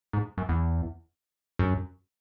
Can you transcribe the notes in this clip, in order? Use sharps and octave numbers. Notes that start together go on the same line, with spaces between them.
G#2
F#2
E2
F#2